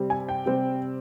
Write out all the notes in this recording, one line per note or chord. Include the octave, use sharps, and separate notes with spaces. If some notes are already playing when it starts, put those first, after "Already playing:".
Already playing: C3 G3 C4
G#5
G5
C3 G3 C4